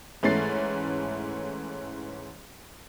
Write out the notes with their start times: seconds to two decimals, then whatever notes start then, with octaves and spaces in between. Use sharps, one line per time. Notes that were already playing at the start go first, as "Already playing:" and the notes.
0.23 G#2 E3 A3 C#4 A6 C7